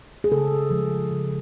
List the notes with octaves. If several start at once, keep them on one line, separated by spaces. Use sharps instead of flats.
G#4
C#3 A4
F3 G#3
C#3